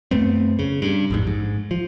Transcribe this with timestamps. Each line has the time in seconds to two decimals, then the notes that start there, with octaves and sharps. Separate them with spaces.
0.11 F#2 A3 B3 C4
0.59 C#3
0.82 G2
1.10 A1 F2 G#2
1.27 G#2
1.71 F3